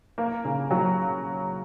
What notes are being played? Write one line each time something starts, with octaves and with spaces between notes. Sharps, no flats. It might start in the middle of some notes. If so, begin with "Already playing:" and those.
A#3
C#3
F#3